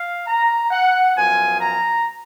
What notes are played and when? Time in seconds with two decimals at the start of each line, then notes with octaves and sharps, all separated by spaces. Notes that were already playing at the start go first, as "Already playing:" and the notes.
Already playing: F5
0.27 A#5
0.71 F#5
1.16 F#2 F3 B3 G#5
1.60 A#5